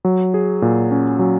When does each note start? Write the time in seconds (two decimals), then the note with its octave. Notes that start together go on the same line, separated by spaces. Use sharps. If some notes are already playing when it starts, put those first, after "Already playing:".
0.05 F#3
0.34 G#4
0.62 A#2
0.91 C#4
1.19 F#3